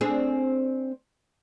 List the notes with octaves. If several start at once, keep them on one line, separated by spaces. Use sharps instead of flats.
C4 D4 G#4